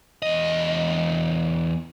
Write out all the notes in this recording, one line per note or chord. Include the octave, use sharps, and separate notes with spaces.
E2 D#5